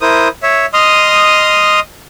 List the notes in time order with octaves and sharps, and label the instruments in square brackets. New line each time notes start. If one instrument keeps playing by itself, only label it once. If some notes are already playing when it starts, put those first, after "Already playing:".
[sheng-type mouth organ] E4 A#4 C5 D#6
C#5 E5
D#5 C6 D#6 F6